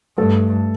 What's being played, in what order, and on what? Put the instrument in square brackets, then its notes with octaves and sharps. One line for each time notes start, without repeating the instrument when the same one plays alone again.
[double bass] G2 [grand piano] A3 A4